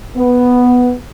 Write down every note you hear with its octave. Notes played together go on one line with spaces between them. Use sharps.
B3